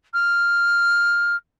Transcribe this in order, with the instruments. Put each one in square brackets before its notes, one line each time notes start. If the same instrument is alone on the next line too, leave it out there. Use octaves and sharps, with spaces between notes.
[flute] F6